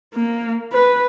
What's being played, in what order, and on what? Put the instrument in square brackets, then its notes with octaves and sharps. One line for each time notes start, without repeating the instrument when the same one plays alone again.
[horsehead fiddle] A#3
B4